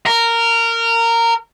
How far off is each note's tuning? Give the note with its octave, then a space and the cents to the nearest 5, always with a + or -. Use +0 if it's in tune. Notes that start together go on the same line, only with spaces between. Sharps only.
A#4 -15